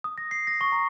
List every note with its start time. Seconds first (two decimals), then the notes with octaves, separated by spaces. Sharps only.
0.04 D#6
0.18 A#6
0.31 C7
0.47 A#6
0.61 C#6
0.72 A#5